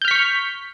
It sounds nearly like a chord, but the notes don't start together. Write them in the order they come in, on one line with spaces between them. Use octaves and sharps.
G6 F6 B6 C#6